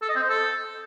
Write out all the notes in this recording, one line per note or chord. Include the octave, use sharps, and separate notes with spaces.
A4
D#5
C4
C5
A4